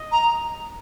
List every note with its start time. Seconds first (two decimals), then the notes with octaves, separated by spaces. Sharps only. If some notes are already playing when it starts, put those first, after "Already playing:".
Already playing: D#5
0.12 A#5